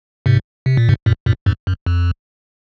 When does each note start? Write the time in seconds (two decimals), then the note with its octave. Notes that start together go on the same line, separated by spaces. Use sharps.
0.26 G#2 C3
0.66 C3
0.77 A#2
0.89 G#2 C3
1.06 F#2 A#2
1.26 F#2 A#2
1.46 F2 G#2
1.67 F#2
1.86 F2